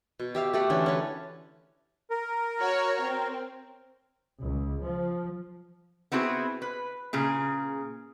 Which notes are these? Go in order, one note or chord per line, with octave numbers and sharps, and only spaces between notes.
B2
G4 E5 F5
A3 G4 F#5
D3 E3 C#4 D4
C#4 B4
A#4
F#4 C#5
C4
C#2
F3
B3 C4 E4 F#4 G#4
B4
A#2 C#3 G#4